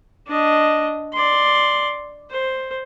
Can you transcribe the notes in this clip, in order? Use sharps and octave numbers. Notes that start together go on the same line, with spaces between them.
D4 D#5
D5 C6
C5